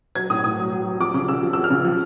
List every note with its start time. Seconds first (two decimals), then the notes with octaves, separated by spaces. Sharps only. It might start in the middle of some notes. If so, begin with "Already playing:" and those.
0.15 F#3 G#6
0.30 A2 D#6
0.43 A2 D#6
0.58 F#3
0.72 F#3
0.87 F#3
1.00 F3 D6
1.14 C#3 D6
1.28 C#3 E6
1.43 F3
1.53 F3 E6
1.64 F6
1.70 C#3
1.84 F3